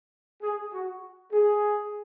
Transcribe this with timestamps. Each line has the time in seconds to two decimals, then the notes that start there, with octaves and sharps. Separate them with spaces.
0.42 G#4
0.72 F#4
1.31 G#4